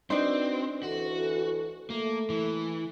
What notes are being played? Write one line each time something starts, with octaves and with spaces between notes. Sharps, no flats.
C4 D4 D#4 F#4 B4 C5 D5
D2 E3 F#4 A4
A3 A#3
E3